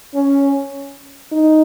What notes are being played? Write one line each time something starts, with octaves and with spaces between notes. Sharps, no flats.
C#4
D#4